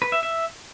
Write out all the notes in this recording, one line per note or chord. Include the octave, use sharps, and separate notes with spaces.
B4
E5
E5